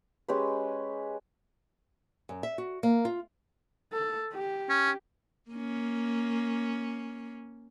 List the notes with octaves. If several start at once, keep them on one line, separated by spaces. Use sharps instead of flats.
G#3 C#4 G4 B4
F#2
E5
F#4
A#3
F4
A4
G4
C#4
A#3 C#4